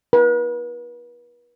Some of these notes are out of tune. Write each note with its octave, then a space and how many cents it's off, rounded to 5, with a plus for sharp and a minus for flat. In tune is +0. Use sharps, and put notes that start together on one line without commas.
B4 -40